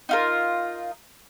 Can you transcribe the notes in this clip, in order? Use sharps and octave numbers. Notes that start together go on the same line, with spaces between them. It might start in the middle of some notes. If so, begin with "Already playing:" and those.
D#4 F4 A#4